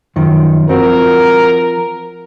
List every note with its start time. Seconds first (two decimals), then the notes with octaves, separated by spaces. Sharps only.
0.16 F#2 D#3 F3
0.69 F3 C4 F#4 A#4